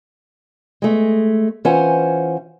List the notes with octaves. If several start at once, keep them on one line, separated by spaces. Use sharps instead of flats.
G#3 A3
E3 C#4 F4 C5 F#5 G#5